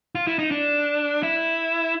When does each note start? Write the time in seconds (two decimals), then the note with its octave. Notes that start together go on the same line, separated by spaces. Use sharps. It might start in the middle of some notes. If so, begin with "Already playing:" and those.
0.15 F4
0.27 E4
0.39 D#4
0.51 D4
1.23 E4